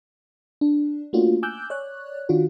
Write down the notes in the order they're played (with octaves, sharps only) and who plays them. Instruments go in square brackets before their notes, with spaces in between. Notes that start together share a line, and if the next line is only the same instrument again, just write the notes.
[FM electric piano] D4
A3 A#3 C#4 D4 F4 F#4
G#5 D6 E6 F#6 G6
C#5 D5 F#6
D#3 D4 F4 F#4